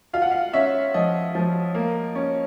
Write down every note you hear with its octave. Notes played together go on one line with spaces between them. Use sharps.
F4 F5
F#5
F5
C#4 E5
F3 D#5
F3
A#3
C#4